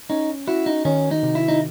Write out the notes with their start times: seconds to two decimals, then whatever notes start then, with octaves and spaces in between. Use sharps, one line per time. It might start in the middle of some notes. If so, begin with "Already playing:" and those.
0.10 C#4 D#4
0.47 E4 F#4
0.66 D#4
0.85 D#3 C#4
1.11 D#4
1.23 C3
1.35 E4
1.48 D#4